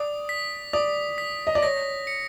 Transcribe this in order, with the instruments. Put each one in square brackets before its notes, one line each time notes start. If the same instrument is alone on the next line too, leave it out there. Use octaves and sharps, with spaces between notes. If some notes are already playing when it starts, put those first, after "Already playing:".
Already playing: [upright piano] D5 [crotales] D#6
[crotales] B6
[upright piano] D5 [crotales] D#6
[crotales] B6
[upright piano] D#5
D5
[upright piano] C#5 [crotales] A#6
[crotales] C#7